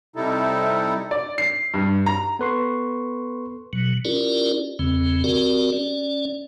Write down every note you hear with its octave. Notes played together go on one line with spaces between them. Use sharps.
C3 G3 D#4 E4 A4
D5
C7
G2
A#5
B3 A4 B4 C6 C#6 C7
B2 F#3
C#4 E4 F4 G4 A#4 D5
E2 C#3 C4
C4 F#4 G4 A#4 D5
C#4 D5